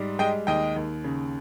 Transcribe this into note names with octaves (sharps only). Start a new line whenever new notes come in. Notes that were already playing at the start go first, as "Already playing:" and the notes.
Already playing: G#2 G3
G#3 D#5 G5
D#2 D#5 G5
D#2
C#3